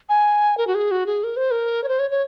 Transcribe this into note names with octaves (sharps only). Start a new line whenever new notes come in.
G#5
A#4
F#4
G#4
F#4
G#4
A#4
C5
A#4
C#5
C5
C#5
C#5